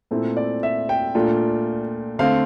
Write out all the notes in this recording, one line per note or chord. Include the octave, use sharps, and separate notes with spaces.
A#2 A3 C4 E4
D5
E5
G5
A#2 A3 D4 F4
D3 A3 C4 F5